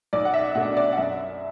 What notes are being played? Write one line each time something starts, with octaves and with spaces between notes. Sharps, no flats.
B1 D5
F#5
E5
B2 A3 D4 F#5
D5
F#5
F#2 E5